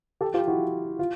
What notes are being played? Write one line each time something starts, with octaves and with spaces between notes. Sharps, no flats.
G4 A4
F4 G4
E4 F#4
F4